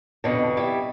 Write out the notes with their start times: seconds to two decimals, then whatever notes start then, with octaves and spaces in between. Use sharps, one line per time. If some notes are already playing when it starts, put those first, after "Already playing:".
0.24 F2 B2 D3
0.57 G3 E4